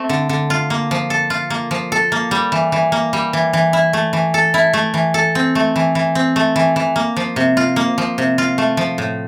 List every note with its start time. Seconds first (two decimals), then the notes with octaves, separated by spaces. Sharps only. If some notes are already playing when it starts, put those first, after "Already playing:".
Already playing: A3 C4
0.09 D3
0.29 D3
0.50 F4
0.70 A#3
0.91 F3
1.10 A4
1.30 F4
1.50 A#3
1.71 F3
1.92 A4
2.12 A#3
2.31 G3
2.52 E3
2.72 E3
2.92 A#3
3.13 G3
3.33 E3
3.53 E3
3.73 E4
3.93 A3
4.13 E3
4.34 A4
4.54 E4
4.73 A3
4.94 E3
5.14 A4
5.35 C4
5.55 A3
5.76 E3
5.95 E3
6.15 C4
6.36 A3
6.56 E3
6.76 E3
6.96 A#3
7.16 F3
7.36 C3
7.57 F4
7.76 A#3
7.98 F3
8.18 C3
8.38 F4
8.58 A3
8.77 F3
8.98 A2